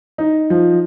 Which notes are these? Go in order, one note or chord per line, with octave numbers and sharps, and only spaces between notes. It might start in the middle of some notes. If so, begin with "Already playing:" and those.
D#4
F3